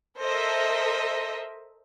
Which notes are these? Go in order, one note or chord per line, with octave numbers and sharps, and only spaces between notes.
A4 A#4 C5 D#5 E5